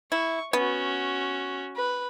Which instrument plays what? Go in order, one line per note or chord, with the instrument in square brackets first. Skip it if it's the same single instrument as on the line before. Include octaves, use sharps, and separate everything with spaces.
[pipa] E4 [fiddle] C#6
[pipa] B3 [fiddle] C#4 F#4
[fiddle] B4